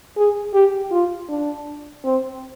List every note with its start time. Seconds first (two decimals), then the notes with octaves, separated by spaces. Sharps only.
0.17 G#4
0.53 G4
0.91 F4
1.29 D4
2.04 C4